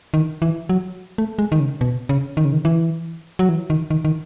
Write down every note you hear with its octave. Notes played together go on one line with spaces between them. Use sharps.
D#3
E3
F#3
A3
G#3
D#3
C#3
B2
C#3
D#3
C#3
D#3
E3
F#3
E3
D#3
D#3
D#3